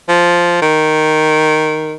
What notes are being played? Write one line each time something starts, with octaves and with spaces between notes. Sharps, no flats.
F3
D#3